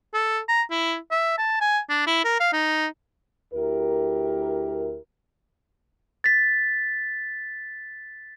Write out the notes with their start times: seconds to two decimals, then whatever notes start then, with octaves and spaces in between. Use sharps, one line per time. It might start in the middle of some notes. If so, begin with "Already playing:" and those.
0.14 A4
0.48 A#5
0.71 E4
1.11 E5
1.38 A5
1.61 G#5
1.89 D4
2.07 E4
2.24 A#4
2.40 F5
2.53 D#4
3.54 D2 E4 G4 A#4
6.24 A6 B6